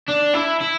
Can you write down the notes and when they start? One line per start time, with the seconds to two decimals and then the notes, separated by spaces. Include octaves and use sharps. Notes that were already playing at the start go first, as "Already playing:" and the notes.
0.09 D4
0.34 E4
0.60 E4